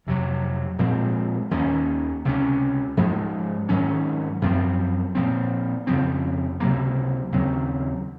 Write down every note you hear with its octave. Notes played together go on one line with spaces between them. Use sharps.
F2 C3 F#3
A#2 F3 G#3 C4
D#2 D#3 A#3 C#4
C#2 C3 F#3 C#4
G#2 F3 G#3
G#2 D#3 F#3 C#4
F#2 F3 C4
A#2 F3 C4
F2 C#3 F3 C4
C#2 C3 F#3 A#3
D#2 C#3 F#3 C4